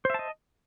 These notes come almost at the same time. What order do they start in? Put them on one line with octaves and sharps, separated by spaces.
C5 E5 A5 D#5